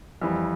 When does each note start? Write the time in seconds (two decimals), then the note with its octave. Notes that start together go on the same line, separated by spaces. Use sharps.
0.21 F2 E3 G3